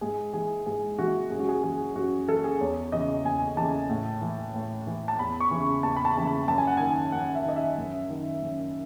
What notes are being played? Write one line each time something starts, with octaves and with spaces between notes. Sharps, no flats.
G#2 G#4
E3 G#4
G#2 G#4
E3 F#4
F#2 G#4
F#4
G#4
E3 G#4
F#2 F#4
E3 A4
G#4
E2 C#5
C#3 E3 D#5
E2 G#5
C#3 E3 A5
A2
E3
A2
E3
A5
E2 B5
C#6
C#3 E3
E2 A5
B5
A5
C#3 E3 A5
B5
F#2 A5
G#5
F#5
D#3 G#5
F#2 F#5
E5
D#3 D#5
E5
F#2
D#3
F#2